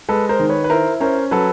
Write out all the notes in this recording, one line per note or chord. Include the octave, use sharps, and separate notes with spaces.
G#3 A4 B4
A#4 C5
D#3
B4 C#5
B4
E4 A#4 C5
C#4 A#4 C5
F#3 A4 B4